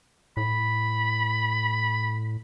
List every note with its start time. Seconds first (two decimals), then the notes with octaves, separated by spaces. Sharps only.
0.37 A2 B5